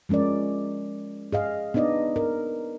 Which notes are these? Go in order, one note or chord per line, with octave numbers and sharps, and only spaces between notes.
F3 G#3 C#4 A#4 D5
G#4 D#5 F5
B3 D4 D#4 D5 D#5
A#4